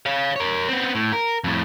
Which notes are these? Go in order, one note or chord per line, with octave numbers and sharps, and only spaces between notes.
C#5 F5
A#4 C#5
B3 C4
A2
A#4
F2 A2